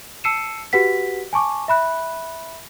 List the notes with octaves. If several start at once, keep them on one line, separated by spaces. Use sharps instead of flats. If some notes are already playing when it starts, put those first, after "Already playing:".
A5 E6 C7 C#7 D#7 E7
F#4 G4 B4 F#5 B6
G#5 A5 C#6 D6
E5 B5 F#6